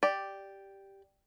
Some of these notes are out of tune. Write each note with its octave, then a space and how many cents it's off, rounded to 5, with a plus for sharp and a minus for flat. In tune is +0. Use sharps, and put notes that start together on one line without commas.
G4 +0 D5 +0